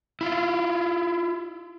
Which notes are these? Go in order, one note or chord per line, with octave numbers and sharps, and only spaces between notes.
E4 F4